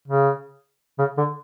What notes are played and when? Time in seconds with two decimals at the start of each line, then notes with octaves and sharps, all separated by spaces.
0.08 C#3
0.99 C#3
1.18 D3